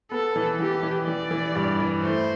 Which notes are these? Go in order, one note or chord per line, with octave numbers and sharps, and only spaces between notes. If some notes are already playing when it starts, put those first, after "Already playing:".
B3 A4
E3
E3 G4
E3
E3 D5
E3
G2
E3
A3 C5